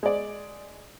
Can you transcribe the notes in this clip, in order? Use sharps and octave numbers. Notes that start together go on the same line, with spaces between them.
G#3 D5